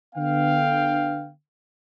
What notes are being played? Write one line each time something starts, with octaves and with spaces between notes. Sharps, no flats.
D3 B3 F5 G5